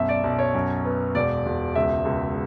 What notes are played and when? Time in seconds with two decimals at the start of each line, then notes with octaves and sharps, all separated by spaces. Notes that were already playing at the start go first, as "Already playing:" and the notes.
Already playing: B1 F#2 E5
0.09 D5
0.24 B1
0.39 C#5
0.54 F#2
0.85 B3
1.15 E1 D5
1.45 E1
1.76 C#2 E5
2.05 C#2